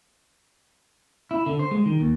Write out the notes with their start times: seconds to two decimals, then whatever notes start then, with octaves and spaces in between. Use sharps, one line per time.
1.31 E4
1.46 D3
1.59 C5
1.71 G#3
1.86 D#3
2.00 D#2